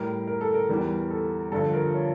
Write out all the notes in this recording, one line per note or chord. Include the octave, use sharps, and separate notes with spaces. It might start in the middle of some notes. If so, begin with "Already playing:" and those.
Already playing: A2 G3 A#4
A#4
A4
A#4
E2 E3 G3
A4
G2 D3 F3 A4
A#4
C#5